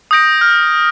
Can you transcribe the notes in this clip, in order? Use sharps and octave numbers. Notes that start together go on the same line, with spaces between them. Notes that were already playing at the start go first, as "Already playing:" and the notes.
D#6 G6 A#6 D7
F6